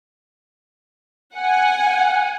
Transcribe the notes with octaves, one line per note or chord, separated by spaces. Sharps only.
F#5 G#5